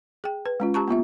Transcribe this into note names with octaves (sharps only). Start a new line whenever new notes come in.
G#4 G5
B4
G#3 C#4 F4
G4 A5 A#5 C#6
A#3 B3 F4 E5